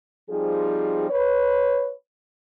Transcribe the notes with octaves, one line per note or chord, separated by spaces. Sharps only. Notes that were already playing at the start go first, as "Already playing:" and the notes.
F3 G3 C4 D#4 F4 G#4
B4 C#5